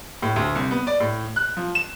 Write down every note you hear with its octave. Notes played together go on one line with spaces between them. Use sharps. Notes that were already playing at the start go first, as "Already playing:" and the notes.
A2
D2
C2
B3
D5
A2
F#6
F3
E7